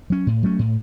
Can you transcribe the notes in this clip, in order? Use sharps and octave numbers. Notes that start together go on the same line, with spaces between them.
F#3 C#4
A2
F#3 A3 C#4
A2